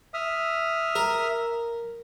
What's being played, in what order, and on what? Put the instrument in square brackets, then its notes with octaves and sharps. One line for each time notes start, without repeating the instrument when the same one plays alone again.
[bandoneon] E5 D#6 F6
[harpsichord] A#4